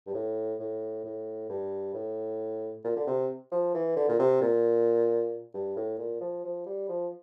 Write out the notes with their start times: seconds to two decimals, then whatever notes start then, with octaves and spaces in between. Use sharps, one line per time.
0.06 G2
0.14 A2
0.60 A2
1.04 A2
1.50 G2
1.94 A2
2.85 A#2
2.96 D3
3.07 C3
3.52 F3
3.74 E3
3.97 D3
4.09 A#2
4.19 C3
4.41 A#2
5.54 G2
5.76 A2
5.99 A#2
6.21 F3
6.44 F3
6.66 G3
6.89 F3